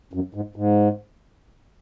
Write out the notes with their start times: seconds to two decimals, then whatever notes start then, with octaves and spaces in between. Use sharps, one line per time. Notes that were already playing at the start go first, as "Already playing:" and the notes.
0.13 F#2
0.34 G#2
0.56 G#2